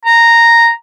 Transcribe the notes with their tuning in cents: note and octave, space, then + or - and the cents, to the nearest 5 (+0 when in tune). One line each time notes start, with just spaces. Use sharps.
A#5 -5